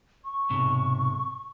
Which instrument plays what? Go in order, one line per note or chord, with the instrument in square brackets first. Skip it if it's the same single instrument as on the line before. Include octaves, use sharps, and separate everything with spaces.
[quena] C#6
[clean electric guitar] B1 G#2 C3